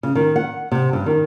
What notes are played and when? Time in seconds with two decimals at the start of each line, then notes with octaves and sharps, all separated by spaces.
0.03 C#3
0.15 D#3
0.36 F#5
0.72 C3
0.93 G2
1.06 D#3